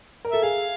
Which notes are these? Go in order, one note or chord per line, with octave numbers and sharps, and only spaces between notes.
A#4
A4 E5
G#4 F5